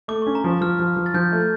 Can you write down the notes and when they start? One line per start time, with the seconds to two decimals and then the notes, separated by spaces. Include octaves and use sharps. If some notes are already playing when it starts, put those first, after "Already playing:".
0.08 A3 D6
0.22 C#6
0.26 C#4
0.35 A#5
0.44 F3 D6
0.61 F3 F6
0.79 F3
0.96 F3
1.06 A6
1.14 F3 G6
1.32 A3